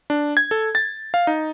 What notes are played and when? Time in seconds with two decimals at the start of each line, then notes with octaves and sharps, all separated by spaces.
0.10 D4
0.37 G#6
0.51 A4
0.75 A6
1.14 F5
1.27 D#4